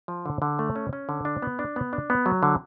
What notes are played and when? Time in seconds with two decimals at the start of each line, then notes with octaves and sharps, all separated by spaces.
0.08 F3
0.26 D3
0.42 D3
0.59 A3
0.76 C#4
0.93 C#4
1.09 D3
1.25 D4
1.42 B3
1.59 D4
1.76 B3
1.93 D4
2.10 B3
2.26 F#3
2.43 D3